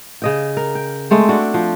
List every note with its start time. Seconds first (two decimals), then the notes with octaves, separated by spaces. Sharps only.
0.22 C#3 D#5 G5
0.57 A#4
0.75 G5
1.11 G#3 A3 C4
1.29 D4 F#4
1.54 F3